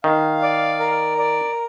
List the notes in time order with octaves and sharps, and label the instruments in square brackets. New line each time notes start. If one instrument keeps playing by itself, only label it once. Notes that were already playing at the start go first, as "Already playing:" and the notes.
[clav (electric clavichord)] D#3 [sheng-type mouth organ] F5
[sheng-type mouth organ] D5
A#4
D5